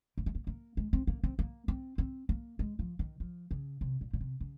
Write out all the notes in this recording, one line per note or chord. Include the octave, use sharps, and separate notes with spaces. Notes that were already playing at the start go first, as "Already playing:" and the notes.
A#3
G#3
A#3
A#3
G#3
C4
A#3
C4
A#3
C4
C4
A#3
G#3
F3
D#3
F3
C#3
C3
A#2
A#2
C3
C#3